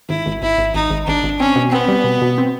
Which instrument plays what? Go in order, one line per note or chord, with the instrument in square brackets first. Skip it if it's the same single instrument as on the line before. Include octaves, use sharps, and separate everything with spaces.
[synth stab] G#1 [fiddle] E4
[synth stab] G#1
[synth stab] G#1 [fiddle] E4
[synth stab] G#1
[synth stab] G#1 [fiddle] D#4
[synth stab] G#1
[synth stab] G#1 [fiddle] D4
[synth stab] G#1
[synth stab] C4 [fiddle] C#4
[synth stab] B2
[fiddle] B3 [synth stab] C4
[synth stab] G3
B2
B2
C4